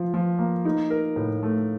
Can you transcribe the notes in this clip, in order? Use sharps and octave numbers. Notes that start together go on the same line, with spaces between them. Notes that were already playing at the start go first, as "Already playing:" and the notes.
Already playing: F3 F4
F3
A#3
D#4
A#4
A2
A3